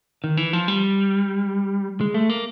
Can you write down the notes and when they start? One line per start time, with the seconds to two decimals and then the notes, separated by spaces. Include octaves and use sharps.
0.24 D#3
0.37 E3
0.53 F3
0.68 G3
2.01 G#3
2.14 A3
2.30 A#3